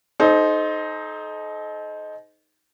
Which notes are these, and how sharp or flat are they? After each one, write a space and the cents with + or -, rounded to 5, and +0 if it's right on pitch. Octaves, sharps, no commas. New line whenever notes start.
D#4 +0 A4 -40 C5 +0